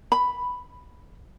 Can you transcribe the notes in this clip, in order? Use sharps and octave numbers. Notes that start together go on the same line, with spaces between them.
B5